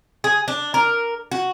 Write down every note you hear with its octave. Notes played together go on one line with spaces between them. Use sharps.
G#4
D4
A#4
F#4